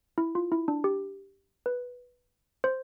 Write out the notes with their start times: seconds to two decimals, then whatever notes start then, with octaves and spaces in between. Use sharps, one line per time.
0.18 E4
0.35 F4
0.52 E4
0.68 D4
0.84 G4
1.66 B4
2.64 C5